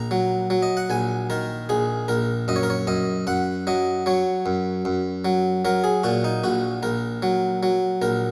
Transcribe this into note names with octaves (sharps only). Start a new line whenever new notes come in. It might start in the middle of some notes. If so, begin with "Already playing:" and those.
Already playing: A#1 A#5
F#3
F#3
D#5
F#5
A#1 G#5
D#3 A#4
A#1 G#4
A#1 A#4
F#2 D#5
C#5
A#4
C#5
F#2 D#5
F#2 F#5
F#3 D#5
F#3 C#5
F#2
F#2
F#3
F#3 A#4
G#4
A#2 F#4
D#4
A#1 F#4
A#1 A#4
F#3
F#3
A#1 A#4